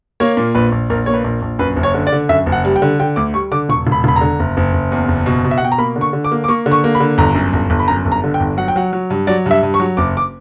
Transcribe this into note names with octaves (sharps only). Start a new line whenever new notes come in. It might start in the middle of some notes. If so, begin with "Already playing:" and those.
A#3 C#5
A#2
A#1 B4
A#1
A#1 A#4
A#3 C#5
B4
A#1
A#1
F#2 B4
F#1
C#5
D3
D5
D3
F#2 E5
F#1
F#5
G3
G5
D3
D3 G5
D2 D6
G3 C#6
D3 D6
E1 C#6
E1
B5
E1 B5
D3 A#5
F#1
F#1
F#1
E2
F#1
B2
B2
E5
F#5
B2 G5
A#5
A#3 B5
D3
C#6
D3
D6
A#3
D6
A#3 C#6
D3
C#6
A#3
B5
D3
G1 A#5
F#2
G1
G1
B5
F#2 A#5
G1
A#5
D3
G5
G1
F#3 F#5
G5
F#3 F#5
F#3
G2
F#3 D5
G2 E5
G2
C#6
F#3
F#1 D6
D6